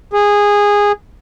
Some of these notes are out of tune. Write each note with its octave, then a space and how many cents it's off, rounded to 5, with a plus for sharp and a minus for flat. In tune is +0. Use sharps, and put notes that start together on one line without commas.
G#4 -15